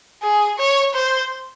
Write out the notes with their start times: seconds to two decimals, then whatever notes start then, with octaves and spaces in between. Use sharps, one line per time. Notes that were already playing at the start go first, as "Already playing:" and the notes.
0.22 G#4
0.58 C#5
0.94 C5